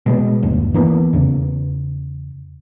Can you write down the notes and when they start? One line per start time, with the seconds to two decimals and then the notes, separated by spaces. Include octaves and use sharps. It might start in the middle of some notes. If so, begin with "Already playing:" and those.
0.06 B2 G#3 B3
0.43 G1 D#2
0.74 E3 A#3 B3
1.13 E2 C#3